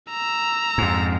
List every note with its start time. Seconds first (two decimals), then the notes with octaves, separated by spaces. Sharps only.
0.11 A#5 E6
0.78 F2 G#2